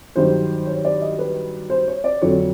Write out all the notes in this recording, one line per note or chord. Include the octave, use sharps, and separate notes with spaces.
G2 D#3 F#3 C5
C#5
D5
D#5
B4
C5
C#5
D5
F2 D3 F#3 C#5